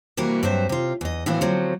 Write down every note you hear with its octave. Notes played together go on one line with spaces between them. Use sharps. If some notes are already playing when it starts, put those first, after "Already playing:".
C3 E3 G3 A#3 F#4 A#4
G2 F#3 C4 C5 E5
C3 F4
E2 D#5
A2 C3 E3 B3 F#4 F5
D3 F3 F#3 C4